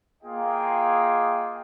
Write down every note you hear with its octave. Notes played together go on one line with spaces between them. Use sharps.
A#3 F4 G#4 D#5 G5